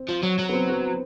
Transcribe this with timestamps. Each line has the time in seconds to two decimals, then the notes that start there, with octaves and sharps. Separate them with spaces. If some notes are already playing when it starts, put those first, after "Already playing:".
Already playing: C4
0.09 F3
0.23 F#3
0.39 F#3
0.49 B3
0.53 C4
0.69 B3